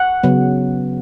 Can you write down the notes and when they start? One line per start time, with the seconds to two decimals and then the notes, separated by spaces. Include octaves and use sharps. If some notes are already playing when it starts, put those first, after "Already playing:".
Already playing: F#5
0.23 C#3 F#3 B3